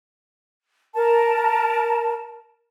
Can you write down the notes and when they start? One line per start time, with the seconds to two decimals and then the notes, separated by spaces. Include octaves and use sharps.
0.96 A#4 A5